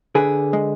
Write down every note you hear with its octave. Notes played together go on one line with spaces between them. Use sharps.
D3 G#4 B4
G#3